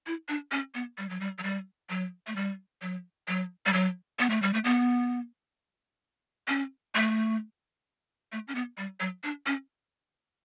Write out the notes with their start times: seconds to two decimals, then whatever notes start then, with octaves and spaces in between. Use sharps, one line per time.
0.07 E4
0.29 D4
0.52 C#4
0.74 B3
0.98 G3
1.09 F#3
1.20 G3
1.39 F#3
1.43 G3
1.90 F#3
2.27 A3
2.36 G3
2.82 F#3
3.28 F#3
3.66 G3
3.73 F#3
4.19 B3
4.30 A3
4.42 G3
4.54 A3
4.64 B3
6.48 C#4
6.95 A3
8.32 A3
8.48 C#4
8.55 B3
8.78 G3
9.00 F#3
9.24 D4
9.46 C#4